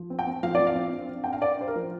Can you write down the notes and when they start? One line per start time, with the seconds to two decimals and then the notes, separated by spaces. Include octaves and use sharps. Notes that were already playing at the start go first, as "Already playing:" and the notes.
Already playing: F3
0.10 C4
0.19 G5
0.27 C4
0.43 F3 F5
0.55 D5
0.60 F3
0.67 F5
0.75 C4
0.93 D4
1.09 D4
1.24 D4 G5
1.33 F5
1.41 D4 D5
1.59 D4 C5
1.67 A#4
1.75 F3